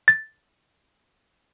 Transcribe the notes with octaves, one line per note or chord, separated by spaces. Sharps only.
A6